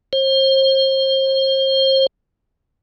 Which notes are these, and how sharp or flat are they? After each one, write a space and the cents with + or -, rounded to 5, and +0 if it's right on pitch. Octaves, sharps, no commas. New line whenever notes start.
C5 +35